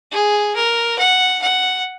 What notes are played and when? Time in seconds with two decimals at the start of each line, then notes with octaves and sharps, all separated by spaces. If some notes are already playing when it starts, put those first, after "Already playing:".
0.12 G#4
0.56 A#4
0.99 F#5
1.42 F#5